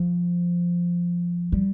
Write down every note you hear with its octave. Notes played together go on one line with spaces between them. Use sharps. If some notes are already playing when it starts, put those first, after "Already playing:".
Already playing: F3
G3